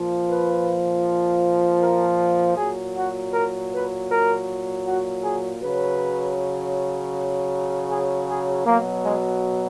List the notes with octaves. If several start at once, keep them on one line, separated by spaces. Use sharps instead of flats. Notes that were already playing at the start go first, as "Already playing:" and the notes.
Already playing: A#2 F3
B4
A#4
A#2 F#3 G#4
F#4
A#4
B4
A#4
F#4
G#4
C#3 F#3 B4
G#4
G#4
B2 F#3 A#3
G#3